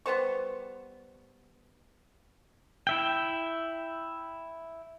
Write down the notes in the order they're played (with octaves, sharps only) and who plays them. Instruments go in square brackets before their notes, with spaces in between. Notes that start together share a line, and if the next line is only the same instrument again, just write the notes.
[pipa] G3 B3 C5 C#6
[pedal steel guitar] E4 E5 G5